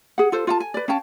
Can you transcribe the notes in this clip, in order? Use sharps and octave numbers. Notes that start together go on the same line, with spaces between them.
G#4 F#5
F4 A4 C5
F4 F#5 A5
G#5
B4 D5
C#4 F5 G5 A5